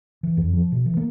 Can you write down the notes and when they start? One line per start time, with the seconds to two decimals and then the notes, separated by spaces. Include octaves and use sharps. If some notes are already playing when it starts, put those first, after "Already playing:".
0.23 E3
0.37 F2
0.53 F3
0.72 B2
0.86 E3
0.97 A#3